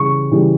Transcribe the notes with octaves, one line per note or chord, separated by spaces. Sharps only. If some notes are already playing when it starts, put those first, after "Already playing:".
Already playing: C#3 E3 G3 C#6
C#3 E3 G3